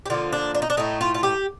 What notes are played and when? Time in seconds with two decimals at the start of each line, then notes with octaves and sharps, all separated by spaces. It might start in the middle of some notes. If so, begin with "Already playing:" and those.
0.06 G4
0.10 D3 F3 A#3 F4
0.33 D4
0.55 D4
0.62 D#4
0.70 D4
0.77 A2 A3 D#4
1.01 F4
1.15 F4
1.23 G4